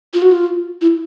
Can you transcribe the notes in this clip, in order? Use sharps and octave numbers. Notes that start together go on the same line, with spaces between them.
F4
F#4
F4
E4